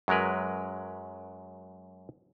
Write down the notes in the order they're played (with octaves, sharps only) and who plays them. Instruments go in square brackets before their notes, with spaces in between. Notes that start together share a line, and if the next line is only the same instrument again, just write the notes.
[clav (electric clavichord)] F#2 F#3 G#3 A#4 B4